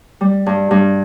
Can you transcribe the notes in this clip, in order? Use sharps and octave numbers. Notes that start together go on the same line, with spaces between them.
G3
G2
G2